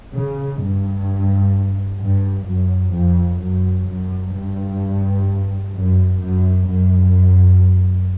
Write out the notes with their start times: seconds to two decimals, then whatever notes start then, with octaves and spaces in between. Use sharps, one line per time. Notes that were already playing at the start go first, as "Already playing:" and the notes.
0.14 C#3
0.60 G2
2.00 G2
2.47 F#2
2.94 F2
3.41 F#2
3.87 F#2
4.34 G2
5.75 F#2
6.21 F#2
6.68 F#2